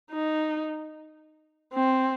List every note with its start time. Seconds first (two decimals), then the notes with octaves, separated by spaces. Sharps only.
0.11 D#4
1.74 C4